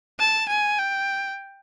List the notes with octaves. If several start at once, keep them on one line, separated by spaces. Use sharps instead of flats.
A5
G#5
G5